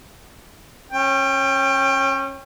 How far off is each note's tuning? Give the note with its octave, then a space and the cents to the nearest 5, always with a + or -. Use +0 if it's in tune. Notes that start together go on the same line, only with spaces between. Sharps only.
C#4 -25 G5 +20